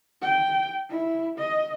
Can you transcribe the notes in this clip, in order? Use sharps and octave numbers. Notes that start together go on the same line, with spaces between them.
G5
E4
D#5